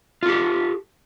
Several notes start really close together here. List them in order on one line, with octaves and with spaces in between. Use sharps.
F4 A4 G4